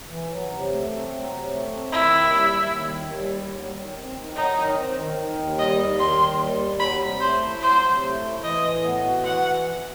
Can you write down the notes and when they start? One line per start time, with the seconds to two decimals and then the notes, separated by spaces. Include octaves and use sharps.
0.10 E3
0.30 F#3
0.50 C3
0.71 A3
0.92 C4
1.12 F#3
1.32 C3
1.51 A3
1.72 C4
1.92 D#3 E4
2.13 D#2
2.33 G3
2.53 D#2
2.73 D#3
2.95 D#2
3.15 G3
3.35 D#2
3.56 F#3
3.76 D#3
3.96 C4
4.16 D#3
4.36 F#3 D#4
4.57 D#3
4.77 C4
4.97 D#3
5.17 D#3
5.38 D#2
5.59 G3 D#5
5.78 D#2
5.98 D#3 C6
6.19 D#2
6.39 G3
6.59 D#2
6.79 F#3 B5
7.01 C3
7.20 A3 C5
7.41 E4
7.61 F#3 C5
7.81 C3
8.02 A3
8.21 E4
8.43 E3 D#5
8.63 A2
8.83 B3
9.04 F#4
9.24 E3 F#5